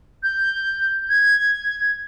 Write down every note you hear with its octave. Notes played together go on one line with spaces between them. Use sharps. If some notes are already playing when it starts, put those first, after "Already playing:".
G6
G#6